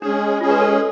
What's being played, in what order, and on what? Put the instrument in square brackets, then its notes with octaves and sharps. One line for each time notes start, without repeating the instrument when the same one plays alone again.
[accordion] G#3 C#4 G#4 [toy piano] D4
[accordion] G#3 C#4 G#4 [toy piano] F4
[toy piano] B4
A4
A4